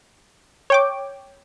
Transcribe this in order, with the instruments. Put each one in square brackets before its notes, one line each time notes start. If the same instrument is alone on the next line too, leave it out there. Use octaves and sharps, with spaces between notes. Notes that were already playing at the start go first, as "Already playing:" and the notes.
[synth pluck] C#5 G5 D6